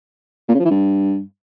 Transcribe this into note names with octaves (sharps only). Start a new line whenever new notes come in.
A#2
C#3
F3
E3
G2